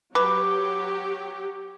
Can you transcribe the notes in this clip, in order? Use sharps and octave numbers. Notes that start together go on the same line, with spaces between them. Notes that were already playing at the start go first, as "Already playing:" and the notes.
F#3 G4 B4 D6